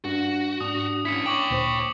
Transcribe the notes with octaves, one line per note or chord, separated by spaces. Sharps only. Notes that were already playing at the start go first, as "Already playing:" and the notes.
G2 F#4
G#2 D4 D#6
C#4 E4 B6 C#7
C#5 G5 C#6 D6 F#7
D2 A#2 C5